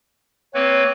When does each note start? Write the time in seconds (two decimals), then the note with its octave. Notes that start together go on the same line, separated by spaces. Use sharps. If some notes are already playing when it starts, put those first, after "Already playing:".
0.54 A#3 C4 B4 C#5